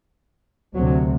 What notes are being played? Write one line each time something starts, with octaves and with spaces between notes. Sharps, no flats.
D2 C3 F#3